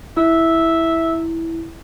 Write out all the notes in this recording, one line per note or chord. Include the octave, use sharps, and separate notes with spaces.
E4 E5